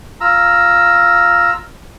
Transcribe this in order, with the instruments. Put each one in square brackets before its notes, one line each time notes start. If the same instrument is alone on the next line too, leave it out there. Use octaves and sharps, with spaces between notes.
[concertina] F4 A#5 E6